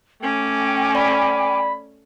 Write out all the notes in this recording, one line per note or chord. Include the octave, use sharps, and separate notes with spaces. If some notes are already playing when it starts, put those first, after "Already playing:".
A3 C#4 G5 G#5 D6
D5 B5